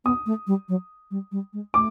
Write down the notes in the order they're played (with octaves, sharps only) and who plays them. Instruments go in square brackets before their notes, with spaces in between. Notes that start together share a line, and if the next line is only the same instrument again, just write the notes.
[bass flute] B3 [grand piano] D#6
[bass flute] A3
G3
F#3
G3
G3
G#3
[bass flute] A3 [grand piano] D6